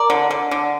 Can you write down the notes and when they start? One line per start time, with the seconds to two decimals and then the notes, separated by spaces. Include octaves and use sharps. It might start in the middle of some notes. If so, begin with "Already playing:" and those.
Already playing: A#4 D5
0.10 D3
0.31 D3
0.51 D3